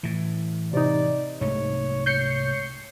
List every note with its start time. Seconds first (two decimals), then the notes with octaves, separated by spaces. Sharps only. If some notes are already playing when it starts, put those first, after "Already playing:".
0.03 A2 E3
0.73 C3 D#4 D5
1.41 C2 G#2 A3 C#5
2.06 C#5 G6 C7 C#7